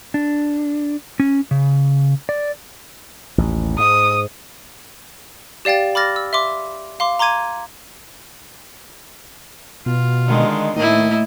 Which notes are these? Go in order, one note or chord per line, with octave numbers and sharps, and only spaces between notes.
D4
C#4
C#3
D5
A1 D#2
G#2 D#6
G4 D5 F5 G5 A6
B5 D6 F6 A6 A#6
E6
E5 C6 D6
F5 C6 D6
A#5 C6 D6 G#6 D#7
B2 F4
D3 D#3 G#3
A2 D#3 A3 A#3 E4 D#5